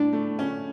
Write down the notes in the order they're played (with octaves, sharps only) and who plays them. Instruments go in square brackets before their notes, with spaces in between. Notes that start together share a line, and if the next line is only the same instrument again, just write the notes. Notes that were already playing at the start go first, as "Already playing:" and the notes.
Already playing: [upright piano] A2 [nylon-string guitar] D4
[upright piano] A3
C#4